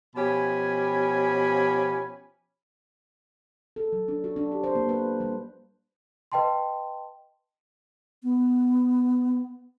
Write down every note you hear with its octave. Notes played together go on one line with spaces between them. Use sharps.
B2 F3 C#4 G4 G#5 B5
A4
F#3
D4
F#4
D4
G4
C5
A#3
B4
G3
B4 D#5 G5 A5 C6
B3